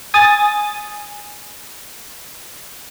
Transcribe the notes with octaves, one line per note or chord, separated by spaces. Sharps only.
G#5 D#6 A6